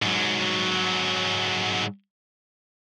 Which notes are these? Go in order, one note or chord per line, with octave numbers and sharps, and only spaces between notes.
G#2 F#3